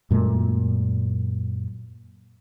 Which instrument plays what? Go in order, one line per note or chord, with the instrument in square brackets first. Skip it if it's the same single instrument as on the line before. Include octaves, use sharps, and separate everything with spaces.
[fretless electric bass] F#2 A#2 G#3 A3